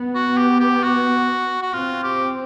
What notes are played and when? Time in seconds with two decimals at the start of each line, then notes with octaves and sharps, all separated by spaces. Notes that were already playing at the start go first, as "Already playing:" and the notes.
Already playing: B3
0.15 F#4
0.37 G4
0.60 G4
0.83 F#4
1.62 F#4
1.73 C4 F4
2.03 G4